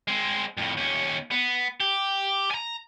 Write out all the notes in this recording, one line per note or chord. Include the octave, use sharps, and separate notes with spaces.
G#3 C4
F2 A2
D#2 C#4
B3
G4
G#5 A#5